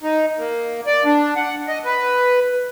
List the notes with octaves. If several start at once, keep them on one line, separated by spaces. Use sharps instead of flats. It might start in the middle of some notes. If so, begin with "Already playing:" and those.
D#4
A#3
D5
D4
F#5
D#5
B4